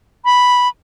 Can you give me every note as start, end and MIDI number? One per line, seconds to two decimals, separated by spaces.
0.25 0.68 83